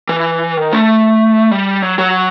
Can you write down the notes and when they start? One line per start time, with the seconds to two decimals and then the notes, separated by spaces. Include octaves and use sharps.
0.09 E3
0.57 D#3
0.72 A3
1.51 G3
1.82 F#3
1.99 F#3